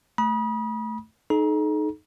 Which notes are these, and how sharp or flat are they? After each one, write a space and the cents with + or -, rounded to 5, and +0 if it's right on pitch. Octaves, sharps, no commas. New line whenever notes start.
A3 +0 B5 -35 D#6 +0
D#4 -10 A4 -45 A#5 +30